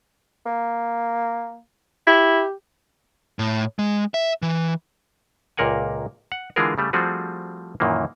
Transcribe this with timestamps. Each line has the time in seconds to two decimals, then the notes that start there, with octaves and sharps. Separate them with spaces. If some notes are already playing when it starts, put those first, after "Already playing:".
0.46 A#3
2.07 E4 G4
3.39 A2
3.79 G#3
4.14 E5
4.42 E3
5.57 C#2 A#2 A#3 A#4 F#5 G#5
6.32 F#5
6.56 D3 E3 G#3 F4 G#4 A#4
6.78 C#3 G3 A3
6.93 F3 G3 A3 C4 F#4 G#4
7.80 F#2 A#2 D#3 E3 A#3